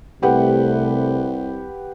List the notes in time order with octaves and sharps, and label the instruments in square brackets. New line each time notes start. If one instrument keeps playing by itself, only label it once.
[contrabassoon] C2 [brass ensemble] C3 A3 [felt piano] G4 B4 F#5